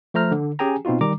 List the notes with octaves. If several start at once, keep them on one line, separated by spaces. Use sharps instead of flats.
F3 A3 C5 A#5 F6
D3
C#4 G4 G#4 G5 G#5 A#5
B2 C4 D#4 F4 F#4
D#3 G3 A#5 D6